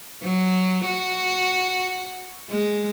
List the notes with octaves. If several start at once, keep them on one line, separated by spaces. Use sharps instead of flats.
F#3
F#4
G#3